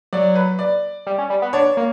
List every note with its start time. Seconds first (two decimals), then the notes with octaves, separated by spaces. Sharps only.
0.13 F#3 D5
0.35 B4
0.59 D5
1.07 G3
1.18 C#4
1.30 G3
1.42 B3
1.53 D4 C#5
1.77 A#3